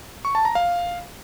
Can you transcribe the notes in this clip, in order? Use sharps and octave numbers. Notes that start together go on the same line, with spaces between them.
C#6
A5
A#5
F5